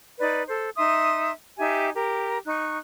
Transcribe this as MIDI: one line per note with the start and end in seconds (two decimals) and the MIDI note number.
0.20 0.42 63
0.20 0.42 71
0.20 0.42 74
0.48 0.69 69
0.48 0.69 72
0.77 1.31 63
0.77 1.31 76
0.77 1.31 84
0.77 1.31 87
1.57 1.90 63
1.57 1.90 67
1.57 1.90 76
1.57 1.90 80
1.95 2.37 67
1.95 2.37 70
2.46 2.77 63
2.46 2.77 85
2.46 2.77 90